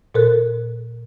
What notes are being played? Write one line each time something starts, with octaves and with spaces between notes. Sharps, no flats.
A#2 A4 A#4 C5 F#6